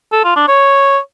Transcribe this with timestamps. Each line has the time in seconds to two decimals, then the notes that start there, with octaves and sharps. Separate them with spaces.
0.12 A4
0.24 F4
0.36 D4
0.48 C#5